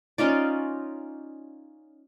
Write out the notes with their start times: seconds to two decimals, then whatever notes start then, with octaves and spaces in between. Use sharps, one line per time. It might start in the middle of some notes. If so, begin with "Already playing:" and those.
0.18 C#4 D#4 F4 D5